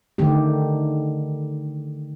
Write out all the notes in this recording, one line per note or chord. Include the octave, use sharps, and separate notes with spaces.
D3 D#3 A3 G4